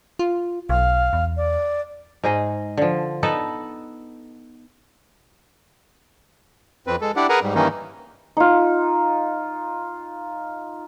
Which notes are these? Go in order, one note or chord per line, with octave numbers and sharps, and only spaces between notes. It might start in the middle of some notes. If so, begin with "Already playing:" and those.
F4
B1 F5
E2
D5
G#2 D#4 G#4 D#5
D3 F3
B3 D#4 A4 B4
F2 C4 B4
G#3 A4
D4 E4 G4 D5 F#5
G#4 A#4 B4 F#5 G#5 A#5
G#2 G3
G2 D#3 E3 A#3 C#4 D#4
D#4 F4